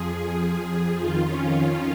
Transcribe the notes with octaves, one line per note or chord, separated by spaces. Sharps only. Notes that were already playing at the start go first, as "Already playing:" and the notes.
Already playing: F2 F3 G#4
F2 D#3 F4
C#4
C#4